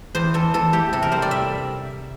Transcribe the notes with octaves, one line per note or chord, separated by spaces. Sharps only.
E2 C5
E2 A4
E2 A4
A3 G4
C3 A4
A#4
G3 C5
D5
G3 E5